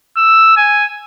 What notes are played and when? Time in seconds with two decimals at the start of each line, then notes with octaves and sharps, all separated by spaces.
0.17 E6
0.57 G#5